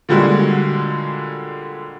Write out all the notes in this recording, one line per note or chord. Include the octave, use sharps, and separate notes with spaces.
A#2 D3 G3 G#3 F#4